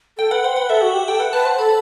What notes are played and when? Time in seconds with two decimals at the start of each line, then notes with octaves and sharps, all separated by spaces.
0.18 A4 G5
0.31 B4 F#5
0.44 C5 F#5
0.56 B4 F#5
0.70 A4 E5
0.82 F#4
0.94 G4
1.08 A4 G5
1.20 B4 F#5
1.33 B4 A5
1.45 C5 A5
1.58 A4 B5